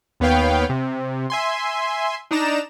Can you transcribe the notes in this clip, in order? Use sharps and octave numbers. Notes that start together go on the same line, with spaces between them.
D#2 B3 B4 C#5 F5 G5
C3
E5 G#5 C6
D4 D#4 D5 A#5 E7